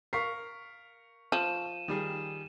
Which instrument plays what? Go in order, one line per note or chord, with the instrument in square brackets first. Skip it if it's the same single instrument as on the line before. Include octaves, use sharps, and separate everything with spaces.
[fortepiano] A#4 F5 [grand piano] C#6 B6 C7
[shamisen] F3 [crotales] D#7 E7
[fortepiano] D#3 G3 G#4